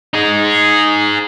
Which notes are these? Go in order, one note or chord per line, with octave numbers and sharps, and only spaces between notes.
D#4 G#4